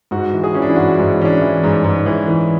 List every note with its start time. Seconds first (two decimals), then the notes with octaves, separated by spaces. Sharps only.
0.11 G#2 F#4
0.33 E3
0.44 G#4
0.54 E3 C#4
0.62 D4
0.69 E4
0.76 G#2 F#4
0.93 E4
0.99 G#2
1.20 E3 C#4
1.25 D4
1.41 E3
1.64 G#2
1.84 G#2
2.06 E3
2.28 E3